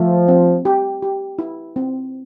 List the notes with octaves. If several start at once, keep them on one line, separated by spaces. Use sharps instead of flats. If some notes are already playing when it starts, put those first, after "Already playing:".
Already playing: F3 A3
C4
G4
G4
E4
C4